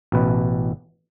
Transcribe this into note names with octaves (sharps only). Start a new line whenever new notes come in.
A1 B2 B4